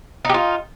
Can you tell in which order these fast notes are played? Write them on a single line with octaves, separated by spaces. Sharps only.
D#4 G4 F4